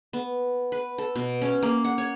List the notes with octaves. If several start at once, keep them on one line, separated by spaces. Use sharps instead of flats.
B3
B4
A4
B2
C#4
A#3
F#5
C#5